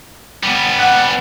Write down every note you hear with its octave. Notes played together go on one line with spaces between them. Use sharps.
G3 B3
F#5